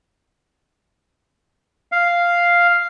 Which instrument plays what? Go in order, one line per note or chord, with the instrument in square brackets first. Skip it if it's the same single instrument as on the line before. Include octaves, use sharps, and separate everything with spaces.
[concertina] F5